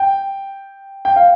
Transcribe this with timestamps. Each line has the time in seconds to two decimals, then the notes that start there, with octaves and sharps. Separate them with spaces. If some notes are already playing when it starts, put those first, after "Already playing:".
Already playing: G5
1.05 G5
1.16 F5